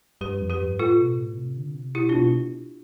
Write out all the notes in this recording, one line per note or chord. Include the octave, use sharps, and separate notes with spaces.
G2 G4 B4
F2
G4 B4
G2
A2 F4 A4
B2
A2
C3
D3
C3
B2 E4 G4
D4 F4
B2